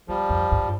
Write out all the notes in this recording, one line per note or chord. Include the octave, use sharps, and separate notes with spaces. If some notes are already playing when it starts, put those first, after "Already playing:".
E2 F3 G3
F2
G2